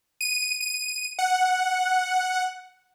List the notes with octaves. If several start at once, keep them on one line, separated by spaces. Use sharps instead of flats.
D#7
D#7
F#5